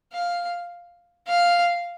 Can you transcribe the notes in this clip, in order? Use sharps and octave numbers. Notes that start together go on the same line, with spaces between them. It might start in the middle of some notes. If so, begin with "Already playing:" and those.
F5
F5